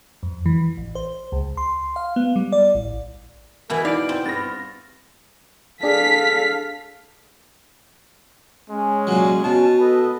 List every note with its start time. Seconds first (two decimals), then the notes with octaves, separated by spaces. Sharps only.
0.23 F2
0.46 E3
0.77 A1
0.95 C5
1.32 C#2
1.57 C6
1.96 F5
2.16 B3
2.36 G3
2.52 D5
2.75 A1
3.70 B2 E3 E4 A#4
3.85 D#4 E4 D5 F5 D7
4.09 C4
4.26 G2 B3 A6 A#6
5.83 D4 G#4 A4 F5 B6
8.70 G#3 C#4
9.07 A#2 F#3
9.44 B2 A5
9.80 A4 B4 D#5